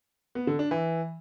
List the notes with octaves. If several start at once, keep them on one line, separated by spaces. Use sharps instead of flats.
B3
D3
D4
E3